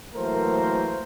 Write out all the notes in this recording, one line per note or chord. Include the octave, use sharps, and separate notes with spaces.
E3 F#3 A3 A#3 A#4 C5